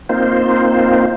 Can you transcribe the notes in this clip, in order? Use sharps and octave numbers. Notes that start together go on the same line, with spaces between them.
A#3 C4 D#4 F4 C5